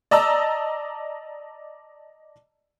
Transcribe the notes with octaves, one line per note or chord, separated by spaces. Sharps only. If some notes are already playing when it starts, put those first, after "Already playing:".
D5 D#5 A5 A#5 E6